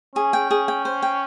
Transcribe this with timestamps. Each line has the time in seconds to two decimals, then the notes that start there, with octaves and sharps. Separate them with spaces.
0.15 C#4 G#4
0.33 G5
0.51 G#4
0.68 G5
0.85 C5
1.02 G5